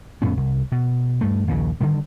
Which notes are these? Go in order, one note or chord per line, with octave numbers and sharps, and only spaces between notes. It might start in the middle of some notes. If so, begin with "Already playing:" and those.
F2 A2 B3 C#4
C2
B2
G2 A3
A#1 D#2 A#2 C#3
D3 D#3 G3